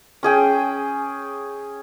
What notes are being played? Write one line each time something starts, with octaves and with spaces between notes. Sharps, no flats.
C#4 G#4 G5